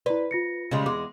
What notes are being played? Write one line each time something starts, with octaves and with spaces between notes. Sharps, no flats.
E4 B4 D5
F4 A#6 C#7
C#3 G3 G#3
E2 G#3 D6